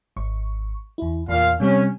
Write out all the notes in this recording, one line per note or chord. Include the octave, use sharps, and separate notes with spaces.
G#1 C#6
E2 E4
E2 A#2 F5
C3 G3 C4 C#4